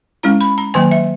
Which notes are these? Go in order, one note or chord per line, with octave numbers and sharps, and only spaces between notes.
G#3 C#4 E4 A#5
B5
A#5
D#3 F#3 A#3 G#5
E5